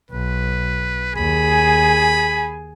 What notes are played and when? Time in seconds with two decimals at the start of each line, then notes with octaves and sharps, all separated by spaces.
0.11 B1 B4
1.16 D#2 G#4 G#5 B5